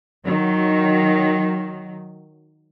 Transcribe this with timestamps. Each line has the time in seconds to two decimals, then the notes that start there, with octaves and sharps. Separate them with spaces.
0.25 D#3 F#3